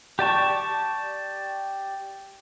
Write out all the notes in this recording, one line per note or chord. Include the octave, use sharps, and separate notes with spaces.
G4 D5 A5 C#6